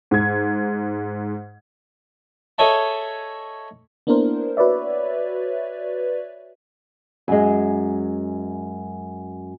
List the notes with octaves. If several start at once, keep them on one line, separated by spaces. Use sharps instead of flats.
G#2 G#6
G#4 A4 C#5 D#5 E5 A5
A#3 B3 D4 E4 A#4 C5
F#4 B4 C#5 D5 E5
F#2 G#3